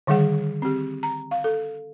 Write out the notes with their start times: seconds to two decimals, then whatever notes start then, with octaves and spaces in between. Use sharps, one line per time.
0.07 D3 D#3 G3 G#4 F#5
0.62 C4 G4
1.03 A#5
1.31 F5
1.44 A4